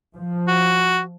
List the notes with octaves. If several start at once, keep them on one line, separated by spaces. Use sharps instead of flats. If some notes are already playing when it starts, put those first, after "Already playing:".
F3
F#4